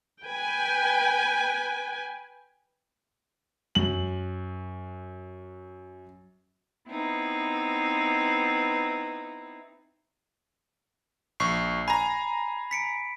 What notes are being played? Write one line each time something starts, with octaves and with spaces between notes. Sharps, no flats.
B4 G5 G#5
F#2 F#7
B3 C4 D#4 E4
A#1 C#6 C7
G#5 A#5 B5
B6 C#7 D7